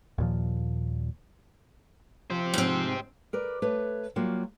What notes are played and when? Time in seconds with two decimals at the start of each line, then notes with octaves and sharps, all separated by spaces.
0.18 D#2 A#2 F3
2.30 F3 G4 C5
2.54 G#2 C4
3.33 A#4 B4 D5
3.62 A3 B4 C#5
4.16 F#3 G3 A#3 F4 F#4